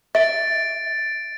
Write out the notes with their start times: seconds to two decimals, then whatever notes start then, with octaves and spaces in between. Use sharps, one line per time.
0.15 E5 A6 D7